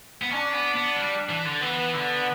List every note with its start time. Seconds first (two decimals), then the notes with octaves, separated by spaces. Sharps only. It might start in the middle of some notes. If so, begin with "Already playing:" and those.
0.22 B3
0.32 C#4 D4
0.53 B3
0.75 B3
0.96 G3
1.29 E3
1.45 D3
1.61 E3 B3
1.93 D3